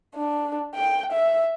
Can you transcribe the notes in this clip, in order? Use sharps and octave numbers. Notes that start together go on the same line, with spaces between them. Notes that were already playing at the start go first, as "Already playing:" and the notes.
D4
G5
E5